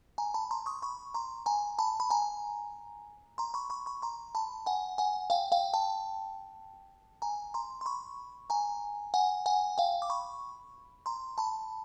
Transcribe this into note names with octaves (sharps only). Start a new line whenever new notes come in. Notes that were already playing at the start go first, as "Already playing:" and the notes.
G#5 A#5
A5 B5
A#5 C6
C#6 D#6
B5 C#6
A#5 C6
G#5 A#5
A5 B5
B5
G#5 A#5
A#5 C6
B5 C#6
B5 C#6
B5 C#6
A#5 C6
A5 B5
F#5 G#5
F#5 G#5
F5 G5
F5 G5
G5 A5
G#5 A#5
A#5 C6
C6
B5 C#6
G#5 A#5
F#5 G#5
F#5 G#5
F5 G5
D6
B5 C#6
A#5 C6
A5 B5